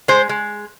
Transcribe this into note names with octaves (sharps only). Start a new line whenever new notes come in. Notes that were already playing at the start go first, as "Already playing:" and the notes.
G#3 C5
G#3